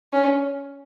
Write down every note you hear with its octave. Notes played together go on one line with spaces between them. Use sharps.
C#4